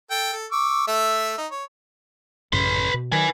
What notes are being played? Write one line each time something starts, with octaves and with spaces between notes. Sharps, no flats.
A4 G5
A4
C#6 D6 E6
A3 E5 E6
D#4
C#5
A1 F#2 C#3 B4 C6
B2
D#3 F#3 B4 G#5